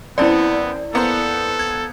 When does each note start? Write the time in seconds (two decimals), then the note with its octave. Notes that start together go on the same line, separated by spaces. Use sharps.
0.18 F#2 B3 C4 E4 D5 A5
0.93 A#3 B3 A4 C5
1.59 G#6